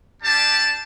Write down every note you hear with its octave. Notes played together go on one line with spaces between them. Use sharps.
G3 D4 G4 A5